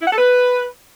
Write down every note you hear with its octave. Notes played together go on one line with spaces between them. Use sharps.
E4
F#5
A4
B4